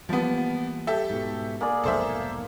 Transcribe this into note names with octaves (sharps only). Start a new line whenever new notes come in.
E3 F3 G3 A#3 B3
G4 A4 E5
G#2 B2
A#3 G#4 D5
F1 B1 G#2 A4 C5 E5